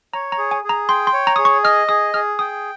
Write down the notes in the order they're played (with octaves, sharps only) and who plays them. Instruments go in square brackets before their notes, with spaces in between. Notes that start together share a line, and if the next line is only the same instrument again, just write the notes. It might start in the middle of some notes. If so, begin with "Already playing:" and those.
[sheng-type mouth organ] C#5 [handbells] A#5
[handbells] A#5
[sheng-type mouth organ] G#4
[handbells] G#5
[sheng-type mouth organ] G#4
[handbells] A#5
[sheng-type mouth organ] G5 [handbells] C6
[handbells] C6
[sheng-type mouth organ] C#5
[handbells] A#5
[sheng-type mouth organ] G#4 [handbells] D#6
[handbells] C#6
[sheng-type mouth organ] D#5 [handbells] F6
[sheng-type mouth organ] G#4 [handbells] D#6
[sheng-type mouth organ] G#4 [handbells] F6
[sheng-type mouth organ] G5 [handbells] D#6